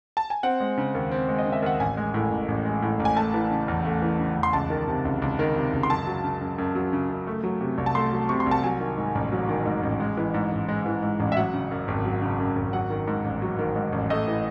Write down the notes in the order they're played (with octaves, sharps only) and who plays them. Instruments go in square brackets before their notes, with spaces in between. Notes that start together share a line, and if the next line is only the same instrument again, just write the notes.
[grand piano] A5
G#5
C4 F#5
G#3
C#3
D#2
C4
G#3
D#5
C#3
E5
D#2 F#5
A1 G#5
G#3
A2
A1
A1
G#3
A2
A1
G#5
A3 A5
E3
C#3
E2
A3
E3
C#3
E2
C6
C#2 A5
D#3
C3
C#2
C#2
D#3
C3
C#2
C6
F#2 A5
F#3
C#3
F#2
F#2
F#3
C#3
F#2
A3
F#3
C3
C2
A5
A3 C6
F#3
C3 C#6
C6
C2
A5
F#3 G#5
D#3
G#2
A1
F#3
D#3
G#2
A1
G#3
E3
G#2
A1
G#3
E3
G#2
A1
E5
F#3 F#5
C#3
F#2
G#1
F#3
C#3
F#2
G#1
F#3 F#5
D#3
G#2
A1
F#3
D#3
G#2
A1
A3 D#5
E3